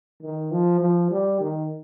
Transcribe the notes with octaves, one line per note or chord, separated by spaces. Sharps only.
D#3
F3
F3
G3
D#3